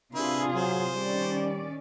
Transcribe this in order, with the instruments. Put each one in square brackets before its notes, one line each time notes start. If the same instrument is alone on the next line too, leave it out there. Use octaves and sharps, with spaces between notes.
[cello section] C3 F4 G#4 [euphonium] D4 [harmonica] E4 B4
[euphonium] F#3 [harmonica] C5
[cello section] D#3 C#4 D5 [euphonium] G3